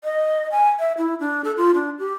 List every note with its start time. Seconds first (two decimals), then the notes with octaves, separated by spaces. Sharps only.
0.04 D#5
0.52 G#5
0.79 E5
0.98 E4
1.20 D4
1.44 A4
1.57 F4
1.74 D4
1.99 G4